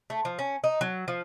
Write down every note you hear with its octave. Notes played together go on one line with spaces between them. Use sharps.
A3
F3
C#4
D#4
F#3
F3